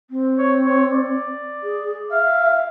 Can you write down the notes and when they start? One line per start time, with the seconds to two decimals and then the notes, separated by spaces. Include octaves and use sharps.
0.10 C4
0.38 C#5
0.65 C#5
0.91 D5
1.63 G#4
2.11 E5 F5